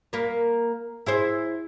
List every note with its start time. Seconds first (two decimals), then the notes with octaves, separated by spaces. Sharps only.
0.13 A#3 A#4 B4
1.06 E4 G#4 C5